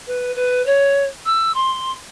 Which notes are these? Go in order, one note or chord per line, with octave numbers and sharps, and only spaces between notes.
B4
B4
C#5
E6
C6